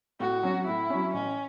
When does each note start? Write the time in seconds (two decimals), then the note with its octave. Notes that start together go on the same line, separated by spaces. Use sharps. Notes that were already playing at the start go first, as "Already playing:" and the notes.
0.20 A2 F#4
0.43 F#3 C#4
0.66 A2 E4
0.90 F#3 C#4
1.13 A1 C#4